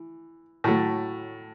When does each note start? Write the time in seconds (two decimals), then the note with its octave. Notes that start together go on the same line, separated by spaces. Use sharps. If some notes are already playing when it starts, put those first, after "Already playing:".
Already playing: E3
0.64 A2 F#3 A3